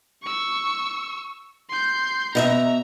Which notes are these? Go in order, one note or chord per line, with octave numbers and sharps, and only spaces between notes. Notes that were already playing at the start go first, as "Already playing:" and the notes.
C#6 E6
C6 G6
B2 D#5 E5 A#5